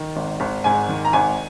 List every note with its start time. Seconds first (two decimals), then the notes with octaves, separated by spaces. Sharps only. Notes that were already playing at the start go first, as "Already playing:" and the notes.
Already playing: D#3
0.16 G#1
0.40 G#1
0.64 G#2 G#5
0.88 D#3
1.05 A#5
1.13 G#1 G#5